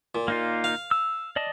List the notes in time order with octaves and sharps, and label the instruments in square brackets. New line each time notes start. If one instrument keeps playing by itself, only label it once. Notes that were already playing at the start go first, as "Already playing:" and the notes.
[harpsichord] A#2
[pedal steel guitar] A#3 D#4 F4
[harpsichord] F5
[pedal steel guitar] E6
D5 D#5 A5